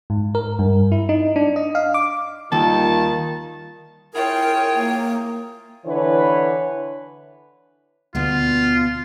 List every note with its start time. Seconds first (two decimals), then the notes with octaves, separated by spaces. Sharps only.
0.10 G#2
0.35 A#4
0.59 G2
0.92 E4
1.09 D#4
1.36 D4
1.56 D#5
1.75 F5
1.94 D6
2.52 D#2 D#3 G3 F4 A5
4.14 E4 F4 G#4 A#4 C#5 G5
4.75 A#3
5.85 D3 E3 B4 C#5
8.15 D2 B2 B3 D4 F4